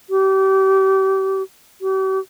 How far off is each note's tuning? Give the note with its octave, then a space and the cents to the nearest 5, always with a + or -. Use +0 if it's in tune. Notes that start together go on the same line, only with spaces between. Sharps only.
G4 -30
G4 -45